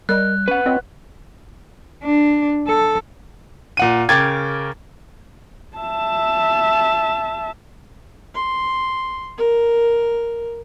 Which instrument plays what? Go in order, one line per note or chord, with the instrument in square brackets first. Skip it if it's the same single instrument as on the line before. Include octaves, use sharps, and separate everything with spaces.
[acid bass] G3 [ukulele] A#4 D#5 [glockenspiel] F#6
[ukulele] C#4 [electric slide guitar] B4 F#5
[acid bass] C4 [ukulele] F4 C#5 D#5
[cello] D4
A4
[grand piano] A#2 F#5 D#7
C#3 A#4 G5 D6 G#6 A6
[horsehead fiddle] E5 A5
[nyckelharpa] C6
A#4